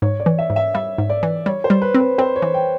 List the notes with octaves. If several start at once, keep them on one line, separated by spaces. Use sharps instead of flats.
G#2 C#5
D5
E3
E5
G#2
E5
G3 E5
G#2
D5
E3
G3 C#5
C5
G3
B4
C4
B4
C4 C5
C#5
E3
G5